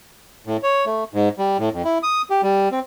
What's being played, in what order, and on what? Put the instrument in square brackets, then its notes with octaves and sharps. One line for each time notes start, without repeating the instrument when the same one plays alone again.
[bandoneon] A2
C#5
A3
G#2
G3
A2
F2
E4
D#6
G4
G3
C4